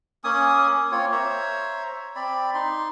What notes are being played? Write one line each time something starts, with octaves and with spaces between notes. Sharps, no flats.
A#3 C#4 G#5 D#6
A#3 C4 F4 C#5
C5 C#5 E5 A#5
C4 D5 B5
D#4 C6